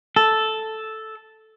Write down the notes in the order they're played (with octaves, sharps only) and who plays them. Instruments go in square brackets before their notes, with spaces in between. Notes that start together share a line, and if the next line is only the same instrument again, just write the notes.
[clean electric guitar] A4